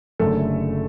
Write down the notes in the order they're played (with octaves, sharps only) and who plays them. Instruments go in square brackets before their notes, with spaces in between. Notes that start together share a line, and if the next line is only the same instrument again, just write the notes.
[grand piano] F#1 F#2 D3 [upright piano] A3 A4